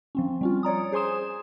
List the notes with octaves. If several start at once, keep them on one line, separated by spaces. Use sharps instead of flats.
F3 C4 C#4
G3 C#4 F4
C#5 D5 A#5 D#6
G#4 C5 G#5 C6 D#6 E7